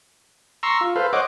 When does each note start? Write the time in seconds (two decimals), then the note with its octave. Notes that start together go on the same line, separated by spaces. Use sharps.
0.63 A#5 C6 C#6 E6
0.81 F4
0.96 A4 B4 C5 F5
1.13 C5 C#5 D#5 F#5 D6